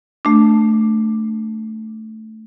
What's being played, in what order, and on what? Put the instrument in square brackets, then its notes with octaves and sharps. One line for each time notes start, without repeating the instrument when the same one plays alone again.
[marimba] A3 D4